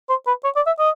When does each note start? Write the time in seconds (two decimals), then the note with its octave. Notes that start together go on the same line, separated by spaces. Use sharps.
0.09 C5
0.27 B4
0.45 C#5
0.56 D5
0.67 E5
0.79 D#5